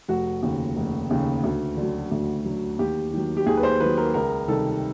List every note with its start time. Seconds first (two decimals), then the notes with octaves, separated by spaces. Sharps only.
0.08 F1 F#4
0.43 D#2 C#3
0.76 F1
1.11 D#2 C#3
1.44 D2
1.77 D3
1.82 F#3
2.11 D2
2.45 D3 F#3
2.79 D#2 G4
3.13 D#3 F#3
3.37 G4
3.46 D#2 G#4
3.57 B4
3.63 C5
3.80 D#3 F#3 B4
3.97 A#4
4.14 C#2 A#4
4.48 C3 D#3 G3 A4